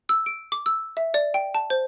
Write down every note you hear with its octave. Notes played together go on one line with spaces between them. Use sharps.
E6
D7
D6
E6
E5
D5
G5
A5
C5